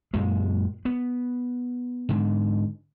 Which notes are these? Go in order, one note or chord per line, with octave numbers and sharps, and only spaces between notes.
F#2 A#2 G#3
B3
G#2 D3